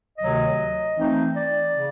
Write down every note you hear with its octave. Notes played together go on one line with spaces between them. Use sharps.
D2 C3 D#3 F#3 D#5
E3 A3 C4 D#4
D5
C#3